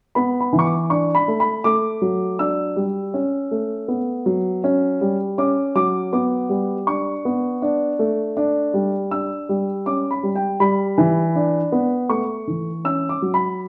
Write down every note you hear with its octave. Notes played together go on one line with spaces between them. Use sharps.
B3 B5
B5
E3
C#6
D6
D4 C#6
B5
A3
B5
A3 D6
F#3
D4 E6
G3
C#4
A3
B3
F#3
C#4
G3
C#4 D6
F#3 D6
B3 D6
G3
D4 C#6
B3
D4
A3
D4
G3
D4 E6
G3
C#4 D6
B5
G3
G5
G3 B5
E3
D4
B3
A3 C#6
E3
C#4 E6
D6
F#3
B5